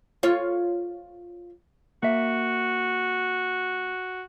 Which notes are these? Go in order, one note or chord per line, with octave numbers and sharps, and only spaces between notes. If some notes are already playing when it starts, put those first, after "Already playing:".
F4 C#5
A#3 F#4 E5